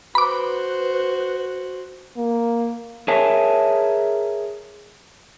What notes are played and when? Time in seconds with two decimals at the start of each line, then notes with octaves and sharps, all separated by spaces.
0.15 F#4 B4 C5 B5 D6
2.17 A#3
3.08 G#4 A#4 C#5 E5 G#5 A5